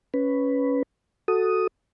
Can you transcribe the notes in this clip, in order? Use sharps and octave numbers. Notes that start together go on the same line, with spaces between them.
C#4 B4
F#4 A4 D#6